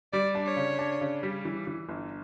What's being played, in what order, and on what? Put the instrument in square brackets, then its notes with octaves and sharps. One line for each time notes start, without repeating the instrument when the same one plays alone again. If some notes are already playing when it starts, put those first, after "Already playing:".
[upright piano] G3 [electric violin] D5
[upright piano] D4
[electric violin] C#5
[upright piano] C#3
D4
C#3
G3
E3
E3
G1